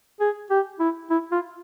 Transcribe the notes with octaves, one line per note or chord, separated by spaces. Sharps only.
G#4
G4
E4
E4
F4